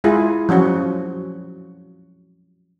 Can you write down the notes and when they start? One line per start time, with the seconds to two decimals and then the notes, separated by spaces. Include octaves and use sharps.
0.04 G#3 E4 F4 G#4
0.49 F3 F#3 C#4 F#4